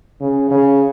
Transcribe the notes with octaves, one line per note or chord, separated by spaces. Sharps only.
C#3
C#3